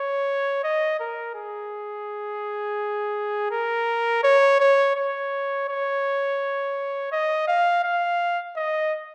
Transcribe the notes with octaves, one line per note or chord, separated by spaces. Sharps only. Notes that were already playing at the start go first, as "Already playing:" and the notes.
Already playing: C#5
D#5
A#4
G#4
A#4
C#5
C#5
C#5
C#5
D#5
F5
F5
D#5